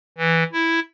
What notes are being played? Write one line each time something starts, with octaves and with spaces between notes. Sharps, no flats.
E3
E4